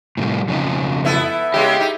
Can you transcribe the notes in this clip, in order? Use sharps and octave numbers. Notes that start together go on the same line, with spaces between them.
A2 C3 G3
F2 C#3 D#4
B3 E4 A4
C#3 G#3 B3 G4
D#4